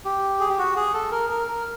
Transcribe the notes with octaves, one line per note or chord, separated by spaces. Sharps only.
G4
G#4
G4
F#4
G#4
A4
A#4
A#4
A#4